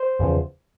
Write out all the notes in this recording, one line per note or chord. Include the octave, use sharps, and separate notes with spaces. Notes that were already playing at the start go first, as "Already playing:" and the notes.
Already playing: C5
E2 C#3 F3